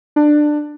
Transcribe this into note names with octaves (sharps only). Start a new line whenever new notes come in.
D4